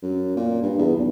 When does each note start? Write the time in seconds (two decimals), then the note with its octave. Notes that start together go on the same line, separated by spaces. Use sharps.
0.02 F#2
0.36 A#2
0.62 G2
0.78 E2
0.95 B1